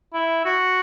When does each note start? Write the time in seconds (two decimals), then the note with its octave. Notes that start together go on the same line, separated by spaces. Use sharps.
0.14 E4
0.45 F#4